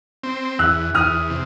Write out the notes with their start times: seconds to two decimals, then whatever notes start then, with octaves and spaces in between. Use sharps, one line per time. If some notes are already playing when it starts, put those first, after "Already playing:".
0.23 C4
0.59 E2 E6 F#6
0.94 E2 D#6 F6
1.30 C3